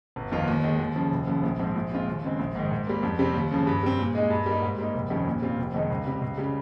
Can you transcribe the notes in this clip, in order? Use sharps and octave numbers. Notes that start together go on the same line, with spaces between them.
G1
F2 D#3 A#3 F4
D#2
D#3 G#3
D#2
C#3 F3
F1
D#2 C#3 F3
A#1
G#2 F3 C4
A#1
A#2 G#3 C4 F4
D#2
C#3 G#3 C4
A#1
G#2 D#3
G#2
G3 A#3
F2
C3 G3 C4
D#2
C#3 F3
G2
G3 C4
A#2
G#3 D#4
G2
G3 A#3 D#4
G#2
G3 A#3 D#4
F1
F2 D#3 G3 C#4
A#2
G3 C4 F4
F1
F2 D#3 G#3 D#4
C#2
C3 G3
C#2
C#3 G3